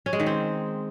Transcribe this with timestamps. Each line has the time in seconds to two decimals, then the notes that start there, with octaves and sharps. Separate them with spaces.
0.06 C#4
0.13 G#3
0.20 D#3
0.26 C4